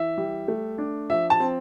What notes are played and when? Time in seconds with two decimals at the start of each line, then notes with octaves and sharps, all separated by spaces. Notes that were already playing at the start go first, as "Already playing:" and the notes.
Already playing: E3 E5
0.18 G3
0.48 A3
0.78 D4
1.10 F3 E5
1.30 A5
1.40 C4